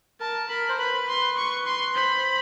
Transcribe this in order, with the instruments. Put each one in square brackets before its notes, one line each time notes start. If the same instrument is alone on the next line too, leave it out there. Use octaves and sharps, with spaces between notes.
[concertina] A#4 [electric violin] A5
[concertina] A#4 [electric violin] B5
[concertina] C5
[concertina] B4 [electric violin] B5
[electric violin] C6
C#6
C6
[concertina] C5 [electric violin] B5